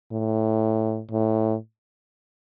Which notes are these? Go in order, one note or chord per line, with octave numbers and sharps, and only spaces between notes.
A2
A2